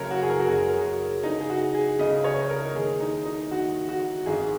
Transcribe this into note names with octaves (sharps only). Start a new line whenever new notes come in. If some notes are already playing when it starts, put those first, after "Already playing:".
Already playing: F#1 F#2 C#3 A#4 C#5
F#4
G#4
A#4
F#4
F#1 F#2 C#3 G#4
A#4
G#4
F#4
C#2 C#3 D#4
G#4
F#4
G#4
C#2 C#3 D#5
C#5
A#4
D#2 D#3 G#4
D#4
D#4
D#2 D#3 F#4
F#4
G#1 G#2 D#3 G#4